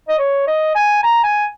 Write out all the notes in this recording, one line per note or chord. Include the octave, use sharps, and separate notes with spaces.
D#5
C#5
D#5
G#5
A#5
G#5